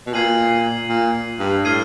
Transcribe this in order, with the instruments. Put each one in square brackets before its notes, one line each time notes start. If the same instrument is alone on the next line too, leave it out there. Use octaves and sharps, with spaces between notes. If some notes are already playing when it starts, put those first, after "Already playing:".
[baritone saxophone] B2
[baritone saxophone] A#2 [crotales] G#6 C7 D#7 F#7
[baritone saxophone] A#2
G2
[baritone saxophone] A2 [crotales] F6 G#6 C7 D#7